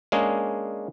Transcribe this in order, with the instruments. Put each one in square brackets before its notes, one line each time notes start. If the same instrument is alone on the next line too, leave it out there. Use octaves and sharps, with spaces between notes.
[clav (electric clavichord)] G#3 A#3 C#4 D4 G#4